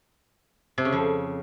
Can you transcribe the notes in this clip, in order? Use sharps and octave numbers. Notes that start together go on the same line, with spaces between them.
C3
C#3
F2